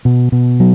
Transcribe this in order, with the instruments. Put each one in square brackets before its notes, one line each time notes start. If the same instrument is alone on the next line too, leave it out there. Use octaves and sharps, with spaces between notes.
[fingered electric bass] B2
B2
F#3